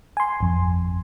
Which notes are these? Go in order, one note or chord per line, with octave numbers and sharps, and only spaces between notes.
G#5 C6
G#1 F2